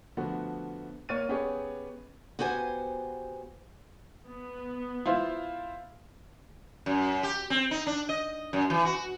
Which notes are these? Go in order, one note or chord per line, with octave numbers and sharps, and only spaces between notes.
D3 F3 A3 B3 F#4
A#3 C#5 F6 A6 D#7
B3 C#4 G4 G#4 B4 C#5
B3 F#4 G4 C5 G#5
B3
E4 F4 C5
F#2
G4
C4
D#4
D4
D#5
F#2
E3
F#4